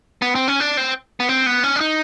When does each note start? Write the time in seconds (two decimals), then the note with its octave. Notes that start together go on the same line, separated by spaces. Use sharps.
0.22 B3
0.35 C4
0.48 C#4
0.60 D4
0.77 C4
1.20 B3
1.29 C4
1.46 B3
1.64 C#4
1.76 D4
1.80 D#4